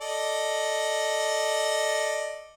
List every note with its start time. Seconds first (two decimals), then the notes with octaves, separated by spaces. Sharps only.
0.01 A4 D5 D#5